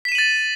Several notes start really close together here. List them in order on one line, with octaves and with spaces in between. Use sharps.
B6 E7 D#7 F#7 A6